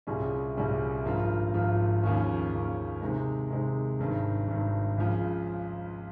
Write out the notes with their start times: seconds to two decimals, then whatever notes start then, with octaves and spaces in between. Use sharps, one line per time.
0.07 C2 A#2 G3 C#4 G#4
0.57 C2 A#2 G3 C#4 G#4
1.05 G#1 G2 F3 A#3 F4
1.54 G#1 G2 F3 A#3 F4
2.03 D#2 C#3 F3 A#3 C#4
2.52 D#2 C#3 F3 A#3 C#4
3.01 C3 D#3 G#3
3.50 C3 D#3 G#3
3.99 G#1 G2 D#3
4.48 G#1 G2 D#3
4.98 C#2 C#3 F3